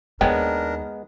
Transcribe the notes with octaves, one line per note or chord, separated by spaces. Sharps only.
D#2 D#3 G#3 B3 D4 A#4 C#5 G5